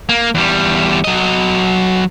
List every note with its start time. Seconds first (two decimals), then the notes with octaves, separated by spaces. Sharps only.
0.09 A#3
0.35 E2 G3
1.04 F#3 D#5